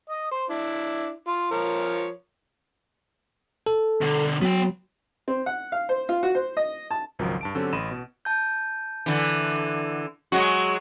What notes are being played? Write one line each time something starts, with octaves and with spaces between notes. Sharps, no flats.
D#5
C5
D4 E4
F4
F3 A#4 C#5
A4
B2 D3
F#3 B3 G5
C4
F#5
F5
C5
F4
F#4
C5
D#5
A5
G#1 C#2 F3 F#3 A#4
G2 A5 D7
D3 F#3 C4 C#4 G4 A4
A1 D#5 B5 C6 D#7 E7
B2
A5 G6
D3 E3
F#3 G#3 F#4 C#6